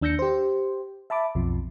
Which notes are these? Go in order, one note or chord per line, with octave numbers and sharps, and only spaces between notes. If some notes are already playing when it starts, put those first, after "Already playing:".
D#2 D4 E6 G6 A#6 C#7
G4 C5
E5 A5 B5 D6
B1 F2 F3